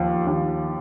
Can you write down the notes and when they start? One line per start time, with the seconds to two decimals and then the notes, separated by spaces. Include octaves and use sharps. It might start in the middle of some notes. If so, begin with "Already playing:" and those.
Already playing: D#2 F3
0.27 D#2